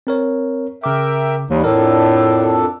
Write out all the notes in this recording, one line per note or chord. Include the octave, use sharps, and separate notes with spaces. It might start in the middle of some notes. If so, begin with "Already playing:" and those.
C4 A#4 C#5
C#3 A#4 E5 G5 D6
D#2 E3 G3 D#4
F2 A2 D4 A4 A#4 D5